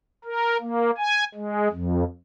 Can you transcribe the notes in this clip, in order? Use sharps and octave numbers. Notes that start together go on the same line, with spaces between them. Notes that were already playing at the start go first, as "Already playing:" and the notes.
A#4
A#3
G#5
G#3
F2